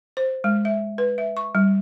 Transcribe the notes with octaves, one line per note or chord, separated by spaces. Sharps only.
C5
G#3
E5
B4
E5
C#6
G3